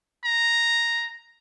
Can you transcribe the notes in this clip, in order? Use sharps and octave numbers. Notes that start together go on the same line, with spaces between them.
A#5